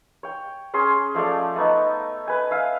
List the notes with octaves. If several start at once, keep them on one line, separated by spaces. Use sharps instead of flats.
C#5 G5
C#4 G#4 C6
F3 A3 C#5 D5
A3 B3 D#4
B4 G#5
E5 F5 G#5